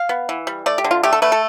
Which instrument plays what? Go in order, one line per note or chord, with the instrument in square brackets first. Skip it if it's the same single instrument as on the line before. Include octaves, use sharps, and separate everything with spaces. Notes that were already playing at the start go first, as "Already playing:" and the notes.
Already playing: [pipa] F5
B3
E3
G3
A3 D5
G4
D3
F4
A3 G4
A4
A3 B4
A4